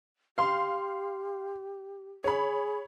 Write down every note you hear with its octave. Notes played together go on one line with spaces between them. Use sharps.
G4 F5 C6
G#4 C#5 B5